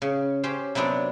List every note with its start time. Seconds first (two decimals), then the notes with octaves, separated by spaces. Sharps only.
0.02 C#3
0.43 C#4 G4 C5
0.75 C3 F#3 B3 C4 D4